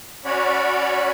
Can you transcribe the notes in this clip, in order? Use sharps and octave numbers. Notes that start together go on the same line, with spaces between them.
C#4 F#4 C#5 D5 B5